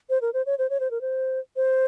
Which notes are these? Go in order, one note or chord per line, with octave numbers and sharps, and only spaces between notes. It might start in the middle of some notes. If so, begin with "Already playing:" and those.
C5
A#4
C5
C#5
C5
C#5
C5
A#4
C5
C5